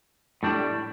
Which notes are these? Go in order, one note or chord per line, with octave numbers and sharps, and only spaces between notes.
A2 G3 D4